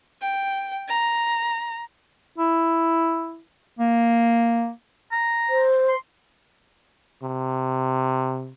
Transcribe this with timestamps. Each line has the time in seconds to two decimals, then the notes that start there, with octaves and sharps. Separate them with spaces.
0.21 G5
0.87 A#5
2.38 E4
3.79 A#3
5.12 A#5
5.49 C5
5.88 C6
7.22 C3